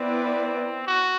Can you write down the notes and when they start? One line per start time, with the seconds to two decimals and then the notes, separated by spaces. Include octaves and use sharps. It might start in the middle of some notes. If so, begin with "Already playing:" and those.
Already playing: B3 C4 E4 B4 D5
0.86 F#4